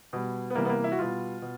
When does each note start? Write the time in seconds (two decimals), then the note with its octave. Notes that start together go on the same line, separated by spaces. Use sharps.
0.13 B2 G3
0.50 B3
0.55 C3 E3 G3 A#3
0.65 B3
0.69 A#3
0.84 E4
0.92 F#4
0.99 B2 G3 F4
1.42 B2